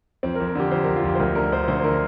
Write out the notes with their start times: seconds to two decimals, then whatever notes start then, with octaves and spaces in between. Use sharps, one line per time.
0.23 F2 C4
0.35 A#4
0.40 F2
0.47 A#4
0.55 D3 G4
0.71 F2 C5
0.84 F2 A#4
0.96 F4
1.04 F2 G4
1.15 C5
1.19 D2 A#4
1.35 D3 A#4
1.52 D2 C5
1.68 D2 C5
1.80 C5
1.84 D3 A#4